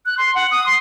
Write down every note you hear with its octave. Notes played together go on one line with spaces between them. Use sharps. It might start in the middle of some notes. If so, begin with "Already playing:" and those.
F#6
C6
F#5
D#6
C6